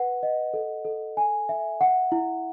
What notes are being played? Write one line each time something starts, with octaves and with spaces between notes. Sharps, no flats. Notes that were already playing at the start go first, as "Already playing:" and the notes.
Already playing: B4 F#5
D#5
A4
A4
G#5
E5
F#5
E4